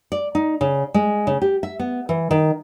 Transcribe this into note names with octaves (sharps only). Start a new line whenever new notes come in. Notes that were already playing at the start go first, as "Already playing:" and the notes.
D5
D#4
C#3
G#3
C#3
G4
E5
B3
E3
D#3